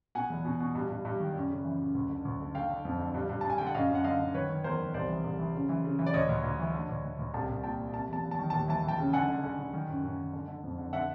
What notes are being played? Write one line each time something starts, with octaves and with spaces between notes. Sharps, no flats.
B2 F#5 G#5
E2
B2
B2
G2
G2
G2
D#3
F#2
C#3
E3
F#2
D2
D3
D2
D3
D3 F5 G5
D3
F2
D3
G2
G2
A5
G2
G#5
D3 G5
F#5
F#2 D#5 F5
F#2
F#5
D3 D#5 F5
D3
D#3 B4 C#5
D#3
E2 A#4 C5
D#3
C2 C5 D5
E3
C2
E3
C#3
E3
C#3
E3
D5
D2 C#5 D#5
D2
D2
E3
D3
D2
D2
D2
C2 G5 A5
C2
A#2 G5 A5
A#2
C3 A5
E2 A5
E2
A5
D#3
D#2 A5
E3 A5
E3
G5 A5
C#3
D3 F#5 G#5
D3
D3
D3
D#3
F#2
F#2
D#3
D3
D3
F2
D3
D3 E5 F#5